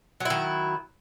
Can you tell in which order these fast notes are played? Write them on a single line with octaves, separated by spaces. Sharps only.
F#3 E4 D#3